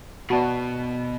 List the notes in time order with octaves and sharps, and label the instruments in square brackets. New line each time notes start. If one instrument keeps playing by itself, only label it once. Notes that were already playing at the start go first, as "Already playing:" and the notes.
[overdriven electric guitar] B2 [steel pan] B3 F#4 [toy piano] D5 A5 B5